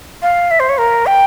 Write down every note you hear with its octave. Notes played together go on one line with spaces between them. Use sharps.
F5
E5
C5
C#5
A#4
G5